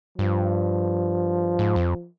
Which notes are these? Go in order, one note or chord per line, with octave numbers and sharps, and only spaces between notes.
G2 F3
G#2
F2